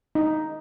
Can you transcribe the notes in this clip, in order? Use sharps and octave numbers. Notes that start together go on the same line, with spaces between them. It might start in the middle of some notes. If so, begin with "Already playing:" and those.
D#4